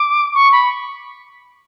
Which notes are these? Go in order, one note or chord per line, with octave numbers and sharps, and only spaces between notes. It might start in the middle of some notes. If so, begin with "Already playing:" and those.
Already playing: D6
C#6
B5